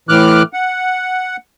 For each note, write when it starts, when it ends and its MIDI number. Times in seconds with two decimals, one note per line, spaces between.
0.09 0.43 45
0.09 0.43 52
0.09 0.43 86
0.09 0.43 89
0.09 0.43 90
0.53 1.37 78